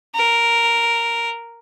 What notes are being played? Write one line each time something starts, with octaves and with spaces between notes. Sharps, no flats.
A#4